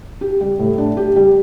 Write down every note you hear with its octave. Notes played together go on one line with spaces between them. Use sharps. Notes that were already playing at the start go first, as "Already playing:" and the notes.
G4
G3
A2
D4
G4
G3